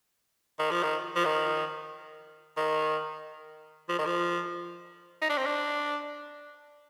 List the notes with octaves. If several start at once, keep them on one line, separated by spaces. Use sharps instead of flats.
D#3
F3
D#3
F3
D#3
D#3
F3
D#3
F3
D#4
D4
C4
D4